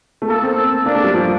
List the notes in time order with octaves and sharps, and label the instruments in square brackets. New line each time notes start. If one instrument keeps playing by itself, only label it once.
[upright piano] A3
[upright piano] A#3 [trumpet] A4
[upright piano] C4
[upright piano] A#3 [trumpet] D4
[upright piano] A3
G3
F3